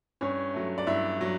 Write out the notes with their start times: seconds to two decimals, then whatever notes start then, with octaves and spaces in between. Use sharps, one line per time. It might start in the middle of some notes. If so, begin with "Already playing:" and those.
0.21 G2 C#4 C#5
0.54 F#3 A3
0.78 D5
0.87 G2 E4 E5
1.21 F#3